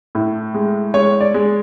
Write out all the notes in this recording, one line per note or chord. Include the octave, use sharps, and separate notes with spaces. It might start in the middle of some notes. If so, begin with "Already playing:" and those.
A2
G#3
G#3 C#5
D5
G#3